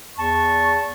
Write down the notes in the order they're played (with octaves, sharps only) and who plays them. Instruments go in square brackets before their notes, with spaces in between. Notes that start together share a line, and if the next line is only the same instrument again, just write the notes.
[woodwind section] E2 A5 C#6